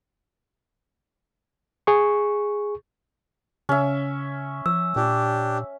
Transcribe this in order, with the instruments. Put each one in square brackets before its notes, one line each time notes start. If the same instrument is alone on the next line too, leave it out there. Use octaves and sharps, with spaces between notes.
[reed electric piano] G#4 C#6
[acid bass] C#3 [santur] C#4 E5
[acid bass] F3 [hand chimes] E6
[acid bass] A#2 [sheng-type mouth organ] D4 G4